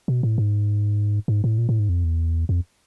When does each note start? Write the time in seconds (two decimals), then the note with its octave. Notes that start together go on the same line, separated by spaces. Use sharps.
0.08 B2
0.23 A2
0.38 G#2
1.28 G#2
1.44 A2
1.58 A#2
1.69 A2
1.79 G#2
1.89 F2
2.04 E2
2.49 F2